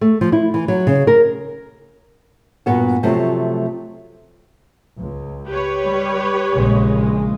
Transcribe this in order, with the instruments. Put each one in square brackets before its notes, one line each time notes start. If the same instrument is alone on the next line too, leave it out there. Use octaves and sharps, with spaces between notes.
[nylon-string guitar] A3
F3
E4
E3
F#3
C#3
A#4
G2 A#2 B3 F#4
C3 F3 F#3 A3 C5
[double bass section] C#2
[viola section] G4 B4 C#5
[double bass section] G3
A#1 C#3 G#3